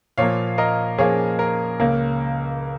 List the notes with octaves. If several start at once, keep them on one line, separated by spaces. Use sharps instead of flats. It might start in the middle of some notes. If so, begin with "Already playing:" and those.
A#2 F3 A#3 C#5 F5
A#4 D#5
A#2 F3 A#3 G#4 C#5
A#4
C#2 C#3 A#3